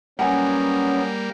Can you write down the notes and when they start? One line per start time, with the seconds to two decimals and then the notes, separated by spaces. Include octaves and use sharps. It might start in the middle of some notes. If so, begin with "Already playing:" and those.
0.19 F#3 G3 A#3 B3 C#4 F#5 G#5